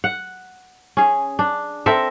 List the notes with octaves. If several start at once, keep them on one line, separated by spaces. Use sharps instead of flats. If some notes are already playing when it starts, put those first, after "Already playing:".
F#5
C#4 G#4
D4
C4 A4 A#4 E5